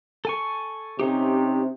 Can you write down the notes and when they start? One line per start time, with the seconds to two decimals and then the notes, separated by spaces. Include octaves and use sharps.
0.25 A4 G#5 C#6
0.99 C3 C#4 D#4 G4